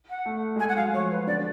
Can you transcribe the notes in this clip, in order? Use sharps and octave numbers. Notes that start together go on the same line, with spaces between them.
F#5
A3
G#3
A3 G#5
F#5
G#3
F#3 F5
F3 C#5
B4
D3 D5